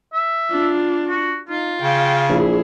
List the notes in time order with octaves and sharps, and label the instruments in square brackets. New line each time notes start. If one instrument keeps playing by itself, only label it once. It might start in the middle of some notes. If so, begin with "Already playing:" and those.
[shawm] E5
[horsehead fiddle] D4 F4
[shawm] F#4
[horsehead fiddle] D#4 [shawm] F4
[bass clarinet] C#3 [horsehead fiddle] G5
[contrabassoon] A#1 [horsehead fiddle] E4 G#4